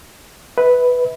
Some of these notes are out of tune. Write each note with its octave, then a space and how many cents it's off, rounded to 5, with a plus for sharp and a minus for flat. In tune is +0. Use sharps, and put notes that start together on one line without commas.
B4 +0 E5 -45